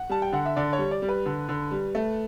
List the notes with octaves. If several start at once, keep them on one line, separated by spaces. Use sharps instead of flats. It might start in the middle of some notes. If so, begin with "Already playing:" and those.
Already playing: F#5
G3 A5
G5
D3 F#5
E5
D3 D5
C#5
G3
D5
G3
B4
D3
D3
G3
A3